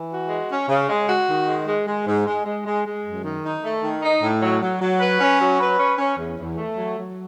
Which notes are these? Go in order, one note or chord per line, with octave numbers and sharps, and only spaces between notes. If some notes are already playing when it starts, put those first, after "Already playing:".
Already playing: E3
F#4
G#3
C#4
C#3
G#3
F#4
D#3
G#3
G#3
G#3
G#2
G#3
G#3
G#3
G#3
F#2
D#3
D#4
A3
D#3
D#4
A2
F#3
F#3
F#3
B4
C#4
F#3
B4
C#4
C#4
E2
E2
A3
F#3
F#3